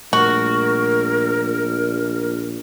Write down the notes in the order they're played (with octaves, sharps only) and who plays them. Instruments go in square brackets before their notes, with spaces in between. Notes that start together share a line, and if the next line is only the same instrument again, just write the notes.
[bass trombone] A#1 [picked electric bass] A#2 G3 A3 [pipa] F#4 [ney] A#4